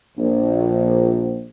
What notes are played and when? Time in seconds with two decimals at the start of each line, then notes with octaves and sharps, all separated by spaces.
0.18 A#1